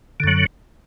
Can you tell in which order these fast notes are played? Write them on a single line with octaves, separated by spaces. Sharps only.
D3 F#2 F#3